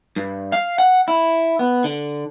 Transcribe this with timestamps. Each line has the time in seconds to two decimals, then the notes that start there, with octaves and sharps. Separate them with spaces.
0.16 G2
0.52 F5
0.78 F#5
1.08 E4
1.59 B3
1.84 D3